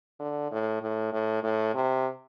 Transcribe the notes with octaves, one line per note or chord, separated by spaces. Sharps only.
D3
A2
A2
A2
A2
C3